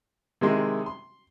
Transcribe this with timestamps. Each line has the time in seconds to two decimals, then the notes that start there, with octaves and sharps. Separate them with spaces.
0.41 C3 D#3 G#3 E4
0.86 C6